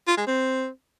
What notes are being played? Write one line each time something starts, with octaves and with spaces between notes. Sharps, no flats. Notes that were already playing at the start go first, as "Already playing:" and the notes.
F4
G#3
C4